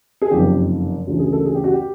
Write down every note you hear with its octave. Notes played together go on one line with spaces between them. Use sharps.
G#4
F#1 F2 C3 D#3 G4
D2 C#3 E3
G#4
A4
G#4
G4
F#4
G4